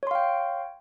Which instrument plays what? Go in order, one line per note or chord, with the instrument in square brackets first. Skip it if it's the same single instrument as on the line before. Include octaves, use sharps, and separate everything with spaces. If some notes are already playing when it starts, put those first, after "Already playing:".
[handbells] C#5
C6
F5
G5